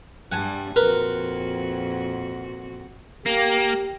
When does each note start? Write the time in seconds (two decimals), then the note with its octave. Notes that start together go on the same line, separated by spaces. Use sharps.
0.32 G2 G3 F#5 G#5 A5
0.76 F2 A#2 F#4 A#4 B4
3.26 A#3 G4